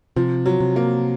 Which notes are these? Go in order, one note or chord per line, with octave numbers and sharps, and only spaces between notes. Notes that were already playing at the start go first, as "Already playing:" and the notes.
C3 F3
F#3
C3
A#3